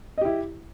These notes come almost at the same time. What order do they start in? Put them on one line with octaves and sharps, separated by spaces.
D#5 G4 E4